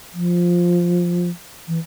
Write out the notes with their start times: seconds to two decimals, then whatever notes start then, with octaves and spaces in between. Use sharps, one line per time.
0.14 F3
1.68 E3